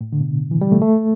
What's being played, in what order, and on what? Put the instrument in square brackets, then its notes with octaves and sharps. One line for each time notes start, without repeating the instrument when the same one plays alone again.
[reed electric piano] A2
D3
B2
E3
G3
A3
A3